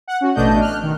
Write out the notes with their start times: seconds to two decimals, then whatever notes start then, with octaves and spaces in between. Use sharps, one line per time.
0.07 F#5
0.21 C#4 F#4
0.35 A1 B2 A3 D4 D#5 G6
0.61 F6 F#6
0.82 D#3